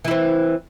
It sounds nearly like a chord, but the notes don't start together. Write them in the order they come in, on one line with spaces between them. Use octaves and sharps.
E3 E4 C4